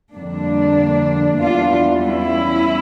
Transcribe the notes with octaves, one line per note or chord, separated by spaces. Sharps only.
F2 D3 G3 A#3 D4
E2 E3 G3 D4 F4
C#4 E4